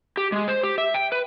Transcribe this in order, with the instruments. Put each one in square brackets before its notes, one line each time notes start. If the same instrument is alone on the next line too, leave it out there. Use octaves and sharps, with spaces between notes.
[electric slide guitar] G4
G#3
C5
G4
E5
G5
B4